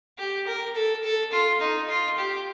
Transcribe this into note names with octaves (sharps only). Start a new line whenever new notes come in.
G4
A#4
A4
A4
F4
D#4
F4
G4